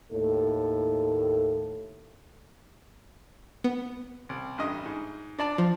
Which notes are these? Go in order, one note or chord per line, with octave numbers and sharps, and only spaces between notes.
D#2 A2 A4
B3
C2
A1 G2 D#5
G#2
D4 D5 A5
F3